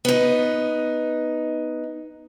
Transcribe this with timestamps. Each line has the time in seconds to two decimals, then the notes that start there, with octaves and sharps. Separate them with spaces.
0.05 B3 D#4